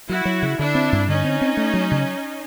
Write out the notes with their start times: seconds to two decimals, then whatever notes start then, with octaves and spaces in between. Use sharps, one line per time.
0.09 F#3 E4 F#4
0.25 F#3
0.43 C#3
0.59 D3 D4 E4
0.75 C4
0.92 G2
1.08 D3 C#4 D#4
1.24 C4
1.41 C4
1.57 A3
1.74 F#3
1.91 C#3